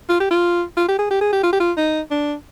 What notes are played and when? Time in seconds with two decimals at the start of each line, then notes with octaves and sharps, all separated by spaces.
0.09 F4
0.20 G4
0.31 F4
0.77 F4
0.88 G4
0.98 G#4
1.11 G4
1.21 G#4
1.32 G4
1.43 F4
1.53 G4
1.60 F4
1.77 D#4
2.11 D4